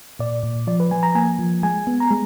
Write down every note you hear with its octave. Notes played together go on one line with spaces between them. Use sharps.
A#2 D5
A#2
F3 D5
B4
F3 G#5
A#5
A#3 G#5
F3
G#3 G#5
B3
A#5
G#3